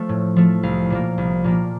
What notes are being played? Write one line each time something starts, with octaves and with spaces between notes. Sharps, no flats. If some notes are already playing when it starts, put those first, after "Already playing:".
Already playing: F3 A3
A2
F3 A3
C2 F5
A#2 F3 A#3
C2
A#2 F3 A#3